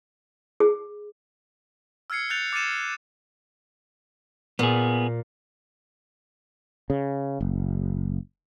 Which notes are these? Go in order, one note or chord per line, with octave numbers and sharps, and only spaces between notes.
G#4
E6 F6 G#6 C7 C#7
F#6 G6 A6 C#7 F7
D6 A6 C#7 D#7 E7
A#2 B3 G#4
C#3
F#1